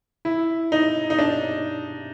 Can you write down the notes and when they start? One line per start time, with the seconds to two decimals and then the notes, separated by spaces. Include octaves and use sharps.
0.25 E4
0.72 D#4
1.10 D#4
1.19 D4